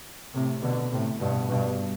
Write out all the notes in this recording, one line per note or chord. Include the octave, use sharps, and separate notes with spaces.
A2 C3
B2 D3
A2 C3
G2 B2
G2 B2